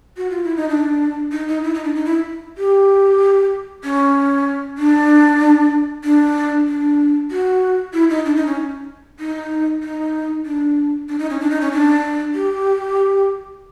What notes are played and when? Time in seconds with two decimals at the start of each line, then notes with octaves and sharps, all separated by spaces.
0.17 F#4
0.30 F4
0.44 E4
0.56 D#4
0.69 D4
1.32 D#4
1.48 D#4
1.64 E4
1.74 D#4
1.84 D4
1.95 D#4
2.05 E4
2.58 G4
3.84 C#4
4.78 D4
6.04 D4
6.68 D4
7.31 F#4
7.93 E4
8.10 D#4
8.25 D4
8.36 D#4
8.46 C#4
9.20 D#4
9.83 D#4
10.46 D4
11.09 D4
11.19 D#4
11.30 C#4
11.40 D4
11.51 D#4
11.61 C#4
11.72 D4
12.35 G4